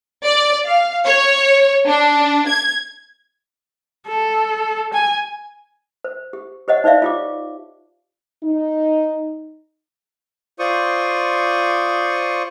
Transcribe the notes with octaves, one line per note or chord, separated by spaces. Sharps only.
D5
F5
C#5
D4
G#6
A4
G#5
C5
G4
G4 C5 C#5 D#5 F#5
D#4 C5 D5 E5 F5
F4 G4 D6
D#4
F4 C5 D5 C#6 D#6